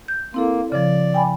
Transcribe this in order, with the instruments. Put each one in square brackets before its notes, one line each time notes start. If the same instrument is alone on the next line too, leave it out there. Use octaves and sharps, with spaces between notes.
[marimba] G6
[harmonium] A#3 [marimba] C4 E4 A4
[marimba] C#3 F3 [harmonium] D5
[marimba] G5 G#5 B5